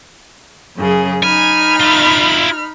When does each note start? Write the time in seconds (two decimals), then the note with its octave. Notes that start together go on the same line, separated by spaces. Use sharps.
0.77 F#2 C#3 G#4
1.23 D#4 G#5 B5 F6
1.80 E4 F4